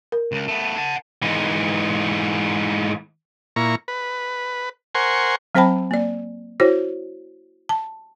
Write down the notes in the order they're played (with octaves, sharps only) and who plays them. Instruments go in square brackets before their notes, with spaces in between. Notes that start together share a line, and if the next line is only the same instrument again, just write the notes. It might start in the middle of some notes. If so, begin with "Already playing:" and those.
[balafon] A#4
[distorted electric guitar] C#2
A3 B3
F#5 A5
[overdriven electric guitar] G#2 E3
[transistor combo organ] A#2 E4 A#5 C#6
B4
A#4 C5 F#5 G#5 C6 C#6
[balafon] F#3 C4 C5 G5 A5 B5
A#3 D5
E4 F#4 C5 C#5
A5